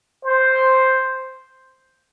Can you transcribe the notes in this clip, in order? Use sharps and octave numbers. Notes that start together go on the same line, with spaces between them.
C5